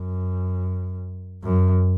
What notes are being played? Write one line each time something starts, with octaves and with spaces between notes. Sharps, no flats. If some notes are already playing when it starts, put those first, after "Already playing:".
Already playing: F#2
F#2